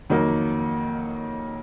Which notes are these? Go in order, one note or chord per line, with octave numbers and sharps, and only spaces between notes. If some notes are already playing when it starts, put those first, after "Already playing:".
F2 D#3 F#3 A#3